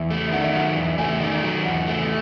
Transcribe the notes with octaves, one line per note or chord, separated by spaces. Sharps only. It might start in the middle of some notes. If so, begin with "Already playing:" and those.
Already playing: E2 E5
A3
D#3 F#5
E5
F#3 F#5
E2
A3 G#5
D#3
F#3
E2 F#5
A3